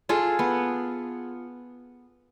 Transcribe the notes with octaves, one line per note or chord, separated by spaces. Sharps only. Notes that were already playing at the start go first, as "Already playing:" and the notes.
F4 G#4 A4 F5
B3